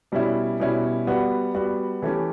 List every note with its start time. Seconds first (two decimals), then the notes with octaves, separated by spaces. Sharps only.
0.12 B2 G3 C#4 E4
0.60 B2 G3 C#4 E4
1.07 G3 B3 F#4
1.54 G3 B3 F#4
2.02 E3 A3 C#4 G4